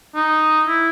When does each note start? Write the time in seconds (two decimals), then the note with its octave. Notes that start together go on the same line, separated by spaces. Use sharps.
0.15 D#4
0.67 E4